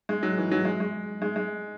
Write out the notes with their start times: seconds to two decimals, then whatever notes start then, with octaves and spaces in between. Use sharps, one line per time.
0.09 G#3
0.23 F#3
0.38 E3
0.51 F#3
0.65 G#3
0.80 G#3
1.22 G#3
1.36 G#3